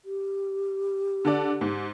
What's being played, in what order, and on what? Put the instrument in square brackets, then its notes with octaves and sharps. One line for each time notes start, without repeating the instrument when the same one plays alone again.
[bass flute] G4
[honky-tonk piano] D3 A4 D5
G#2